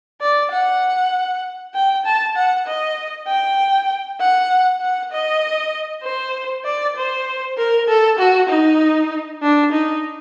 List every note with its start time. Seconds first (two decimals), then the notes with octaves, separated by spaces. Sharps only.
0.21 D5
0.51 F#5
1.74 G5
2.05 A5
2.36 F#5
2.66 D#5
3.28 G5
4.20 F#5
4.81 F#5
5.12 D#5
6.04 C5
6.65 D5
6.96 C5
7.58 A#4
7.88 A4
8.19 F#4
8.49 D#4
9.42 D4
9.72 D#4